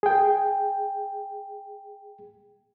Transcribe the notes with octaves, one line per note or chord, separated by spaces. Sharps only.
G#4 G5